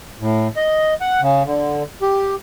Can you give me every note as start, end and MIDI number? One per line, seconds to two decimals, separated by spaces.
0.20 0.48 45
0.56 0.94 75
1.01 1.21 78
1.21 1.43 49
1.45 1.83 50
2.02 2.35 67